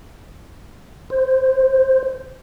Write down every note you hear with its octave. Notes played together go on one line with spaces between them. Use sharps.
C5